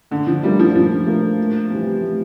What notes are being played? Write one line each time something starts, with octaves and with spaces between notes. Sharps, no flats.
A#2 D3
F3
G3 A3 D4 F4 A#4
F3
A#2 F3
A3 D4 F4 A#4
A2
E3 G3 C4
A2